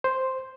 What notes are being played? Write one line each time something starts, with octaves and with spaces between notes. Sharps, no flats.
C5